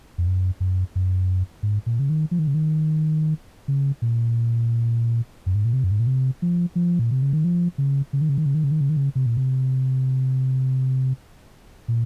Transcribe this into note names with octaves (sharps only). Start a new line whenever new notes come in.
F2
F#2
F#2
F#2
G#2
A#2
C#3
D#3
F3
D#3
C#3
D#3
C#3
A#2
F#2
G#2
A#2
C3
F#2
G#2
A#2
C3
F3
F3
A#2
C3
C#3
D#3
F3
C#3
C#3
D#3
C#3
D#3
C#3
D#3
C#3
D#3
C#3
D#3
C#3
C3
A#2
C3
A#2